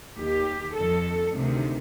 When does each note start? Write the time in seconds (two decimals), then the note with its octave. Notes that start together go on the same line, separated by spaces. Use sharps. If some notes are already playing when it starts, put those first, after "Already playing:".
0.17 D#2 D#3 G4
0.75 F2 D#3 A4
1.33 D2 C3 D#3